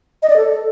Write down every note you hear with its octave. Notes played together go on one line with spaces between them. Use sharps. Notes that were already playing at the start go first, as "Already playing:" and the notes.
D#5
D5
A4